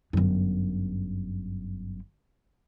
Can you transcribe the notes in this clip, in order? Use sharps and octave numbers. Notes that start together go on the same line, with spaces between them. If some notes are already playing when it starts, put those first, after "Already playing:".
G1 F#2